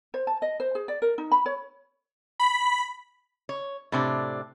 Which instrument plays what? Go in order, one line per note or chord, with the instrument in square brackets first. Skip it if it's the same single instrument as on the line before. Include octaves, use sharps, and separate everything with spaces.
[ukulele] C5
A5
D#5
C5
G#4
D5
A#4
D#4
B5
C#5
[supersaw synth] B5
[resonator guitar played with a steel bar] C#5
A2 C3 D4